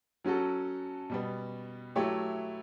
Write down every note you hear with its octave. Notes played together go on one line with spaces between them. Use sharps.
F#3 C#4 F#4 A4
B2 G3 B3
F#3 A3 E4 G4 C#5